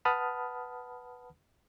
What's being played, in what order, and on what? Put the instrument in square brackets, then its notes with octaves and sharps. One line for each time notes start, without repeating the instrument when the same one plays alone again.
[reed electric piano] B4 F#5 A5 B5 D#6 F6